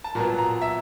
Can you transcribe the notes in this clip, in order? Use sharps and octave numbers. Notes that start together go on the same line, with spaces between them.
A5
A#2 F#3 B3 A#5
A#5
E5